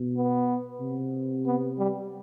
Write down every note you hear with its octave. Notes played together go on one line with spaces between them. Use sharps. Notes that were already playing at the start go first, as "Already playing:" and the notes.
Already playing: B2
B3
C3
B3
G3